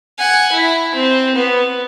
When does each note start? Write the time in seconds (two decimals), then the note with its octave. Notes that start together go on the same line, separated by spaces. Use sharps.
0.18 F#5 G#5
0.52 E4
0.95 C4
1.36 B3